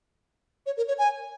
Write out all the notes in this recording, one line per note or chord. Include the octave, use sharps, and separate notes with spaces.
C#5
A#4
C#5
G#5